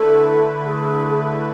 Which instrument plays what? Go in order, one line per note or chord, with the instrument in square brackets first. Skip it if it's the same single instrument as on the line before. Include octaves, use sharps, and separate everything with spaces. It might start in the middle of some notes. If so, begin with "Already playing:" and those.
Already playing: [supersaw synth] D3 A3 E4 B4 [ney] A4
[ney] G#4